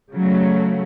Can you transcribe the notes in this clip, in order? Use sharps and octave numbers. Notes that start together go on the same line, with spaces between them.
C#3 F#3 A3